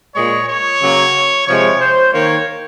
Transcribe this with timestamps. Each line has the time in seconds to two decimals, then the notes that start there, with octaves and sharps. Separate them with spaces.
0.15 A#2 G#3 C#5
0.48 C#5
0.82 C#3 F#3 A#3
1.48 C3 F3 G#3 C#5
1.80 C5
2.13 D#3 A#3 C#5